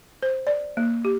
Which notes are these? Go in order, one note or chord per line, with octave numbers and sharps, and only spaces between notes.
C5
D5
A#3
G4